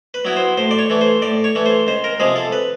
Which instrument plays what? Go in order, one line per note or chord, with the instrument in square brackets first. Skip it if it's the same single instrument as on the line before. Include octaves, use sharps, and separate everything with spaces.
[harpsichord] B4
F#3 B3 E4
C5
A2 C5
D5
C#5
E3 A3
C5
A2 D5
C#5
E3 A3
C5
C#2 C5
A#4
C3 F3 G#3 G#4
A4
B4